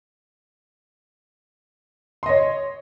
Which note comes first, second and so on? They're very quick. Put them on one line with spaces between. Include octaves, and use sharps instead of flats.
C6 D#5 C#5